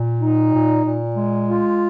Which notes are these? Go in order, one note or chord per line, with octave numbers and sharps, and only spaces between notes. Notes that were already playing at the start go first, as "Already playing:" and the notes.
Already playing: A#2
D#4
A#2
A#2
G#3
F4